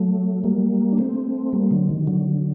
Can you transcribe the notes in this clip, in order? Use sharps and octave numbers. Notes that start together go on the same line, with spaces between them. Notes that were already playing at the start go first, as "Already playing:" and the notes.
Already playing: F#3 A3
G3 A#3
D4
A3 C4
G3 A#3
D3 F#3
D#3
D3 F#3